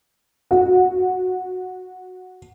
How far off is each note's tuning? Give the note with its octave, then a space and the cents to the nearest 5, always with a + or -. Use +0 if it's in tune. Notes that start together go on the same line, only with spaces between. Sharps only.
F#4 -10